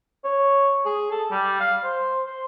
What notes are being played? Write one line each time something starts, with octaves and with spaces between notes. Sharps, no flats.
C#5
G#4
A4
G3
F5
C5
C5